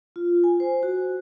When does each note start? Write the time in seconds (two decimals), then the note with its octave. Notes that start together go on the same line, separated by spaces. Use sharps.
0.16 F4
0.44 G#5
0.60 C5
0.83 F#4